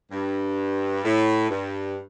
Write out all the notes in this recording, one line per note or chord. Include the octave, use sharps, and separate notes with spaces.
G2
A2
G2